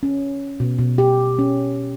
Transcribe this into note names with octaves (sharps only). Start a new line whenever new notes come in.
C#4
B2
B2
G4
C#4